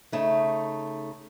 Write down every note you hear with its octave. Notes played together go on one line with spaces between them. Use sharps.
C#3 A3 D#4